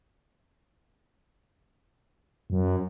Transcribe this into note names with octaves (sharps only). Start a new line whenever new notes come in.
F#2